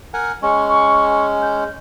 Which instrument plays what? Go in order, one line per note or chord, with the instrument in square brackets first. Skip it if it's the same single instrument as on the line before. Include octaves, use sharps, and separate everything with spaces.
[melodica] A#4 F#5 G#5
[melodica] G#3 C#4 [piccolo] C#6
[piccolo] C#6
G6